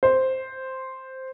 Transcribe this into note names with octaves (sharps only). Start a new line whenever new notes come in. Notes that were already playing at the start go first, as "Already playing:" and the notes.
C5